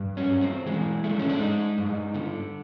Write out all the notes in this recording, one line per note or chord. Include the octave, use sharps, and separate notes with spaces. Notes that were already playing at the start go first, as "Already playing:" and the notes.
Already playing: G2
C#4
G2
C4
E3 G#3
G#3 A3
C#4
D4
G#3 D#4
G2
D3